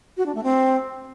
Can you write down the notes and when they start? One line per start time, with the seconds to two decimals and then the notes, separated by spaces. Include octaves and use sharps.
0.17 F#4
0.26 D4
0.35 A3
0.44 C4